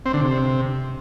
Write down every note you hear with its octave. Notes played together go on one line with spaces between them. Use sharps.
C4
D3
C3